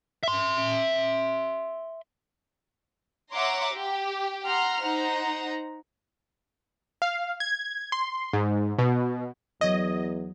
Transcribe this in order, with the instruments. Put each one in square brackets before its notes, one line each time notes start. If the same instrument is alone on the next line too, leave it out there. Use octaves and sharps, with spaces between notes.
[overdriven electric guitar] E5 C6
[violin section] C#5 E5 F#5 A#5 C6 D6
G4
F#5 A#5 C6 F6
D#4 C5 F#5 A#5
[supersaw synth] F5
G#6
C6
G#2
B2
[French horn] E2 [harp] F#3 G#6 D#7 [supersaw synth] D#5